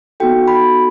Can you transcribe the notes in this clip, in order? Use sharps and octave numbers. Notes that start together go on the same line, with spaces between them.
B3 D#4 F#4 A4 G5
B5